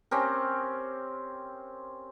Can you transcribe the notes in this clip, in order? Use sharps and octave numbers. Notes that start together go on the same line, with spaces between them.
C4 C#4 G4 A#4